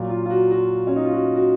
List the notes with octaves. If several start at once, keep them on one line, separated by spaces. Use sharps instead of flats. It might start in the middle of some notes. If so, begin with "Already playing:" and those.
Already playing: A#2 F#3
F4
F4
F#4
F#4
C#4
D#4
F4
F#4
F#4